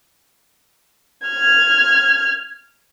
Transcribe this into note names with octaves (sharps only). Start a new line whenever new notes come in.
F6 G#6